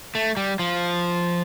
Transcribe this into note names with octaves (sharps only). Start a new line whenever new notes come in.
A3
G3
F3